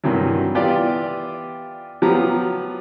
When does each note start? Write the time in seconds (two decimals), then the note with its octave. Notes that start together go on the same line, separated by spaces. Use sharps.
0.04 G2 C3 D#3 E3 F#3
0.55 E3 B3 F4 G4 D5
2.02 F3 F#3 B3 G4 A#5